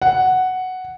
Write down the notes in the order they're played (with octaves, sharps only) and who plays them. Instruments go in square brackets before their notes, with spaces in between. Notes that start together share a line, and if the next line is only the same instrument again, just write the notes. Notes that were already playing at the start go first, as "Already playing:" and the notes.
[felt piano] F#5